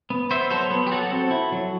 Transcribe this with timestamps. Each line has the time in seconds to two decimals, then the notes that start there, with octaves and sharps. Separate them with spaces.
0.10 B3
0.31 B3 C5 E5
0.50 F#3 A4 C5
0.71 B3
0.87 G4
0.91 F#3 F#4 A4
1.11 C4
1.31 E4
1.52 F#3